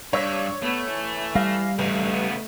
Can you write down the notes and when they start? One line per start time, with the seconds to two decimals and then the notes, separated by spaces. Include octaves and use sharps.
0.13 G2 D4 C#5 E6
0.62 A3 B3
0.91 E3
1.35 G3 F5 A#6
1.79 A1 G2 C#3 A3
2.08 C#3 B3